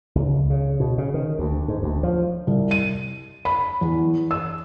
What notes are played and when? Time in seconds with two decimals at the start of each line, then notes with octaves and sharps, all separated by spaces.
0.15 C#2
0.50 C#3
0.80 B2
0.98 C#3
1.14 D#3
1.39 D2
1.68 G#2
1.83 D2
2.03 F3
2.47 C2
2.71 D#7
3.45 B5
3.81 E2
4.31 E6